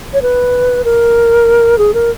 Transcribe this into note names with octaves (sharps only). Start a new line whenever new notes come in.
C#5
B4
A#4
G#4
A#4